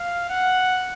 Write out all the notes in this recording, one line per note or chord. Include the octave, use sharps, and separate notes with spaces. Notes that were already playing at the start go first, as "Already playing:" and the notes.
Already playing: F5
F#5